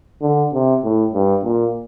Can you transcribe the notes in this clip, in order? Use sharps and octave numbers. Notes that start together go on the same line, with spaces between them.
D3
C3
A2
G2
A#2